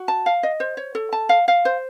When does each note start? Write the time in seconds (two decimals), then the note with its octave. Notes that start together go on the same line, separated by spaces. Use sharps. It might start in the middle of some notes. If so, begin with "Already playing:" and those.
Already playing: F#4
0.08 A5
0.26 F5
0.43 D#5
0.60 C5
0.77 C#5
0.95 A4
1.13 A5
1.29 F5
1.48 F5
1.65 C5